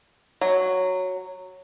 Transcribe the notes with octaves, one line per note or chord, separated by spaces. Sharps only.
F#3